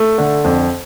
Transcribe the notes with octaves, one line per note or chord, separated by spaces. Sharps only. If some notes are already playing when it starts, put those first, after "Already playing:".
Already playing: A3
D3
F2